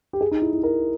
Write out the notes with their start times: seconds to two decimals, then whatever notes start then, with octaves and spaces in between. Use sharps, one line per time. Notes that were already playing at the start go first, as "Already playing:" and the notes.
0.13 G4
0.21 G#4
0.31 D#4
0.42 E4
0.53 E4
0.63 A#4